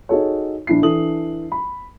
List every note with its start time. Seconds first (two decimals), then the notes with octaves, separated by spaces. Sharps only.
0.09 D#4 F#4 G#4 A4 C#5
0.67 A#1 D4 E4 C7
0.82 E3 D4 A4 D#6 F#7
1.52 B5